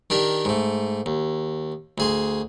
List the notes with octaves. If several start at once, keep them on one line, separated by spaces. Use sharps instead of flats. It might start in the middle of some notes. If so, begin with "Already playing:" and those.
D#3 D4 G4 A#4
G#2 A3
D#2
D2 G#4 C6